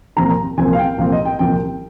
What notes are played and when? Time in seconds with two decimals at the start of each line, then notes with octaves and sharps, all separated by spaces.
0.16 C2 A#2 F3 C4 A#5
0.58 C2 A#2 F3 C4 G#5
0.73 F5
0.79 G5
0.98 C2 A#2 F3 C4 F5
1.12 D#5
1.25 G5
1.39 C2 A#2 F3 C4 G5